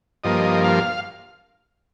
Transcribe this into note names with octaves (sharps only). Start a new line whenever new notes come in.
G2 F3 A#3 D#5
F5